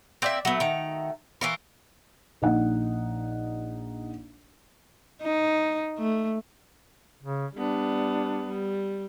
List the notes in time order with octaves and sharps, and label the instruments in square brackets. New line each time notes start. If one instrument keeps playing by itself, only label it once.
[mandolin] A#3 D6 G6 [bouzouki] C4 D5 E5
[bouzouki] F#3 B3 [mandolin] A3 F#4
[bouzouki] D#3 A#5
[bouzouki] E3 F4 A#4 [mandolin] C#6
[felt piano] A#1 D#4 F#5
[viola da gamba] D#4
A3
[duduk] C#3
[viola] G3 B3 [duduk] D4
[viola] G3